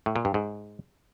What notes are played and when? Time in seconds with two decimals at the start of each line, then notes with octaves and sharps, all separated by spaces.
0.06 A2
0.16 A#2
0.25 G2
0.34 G#2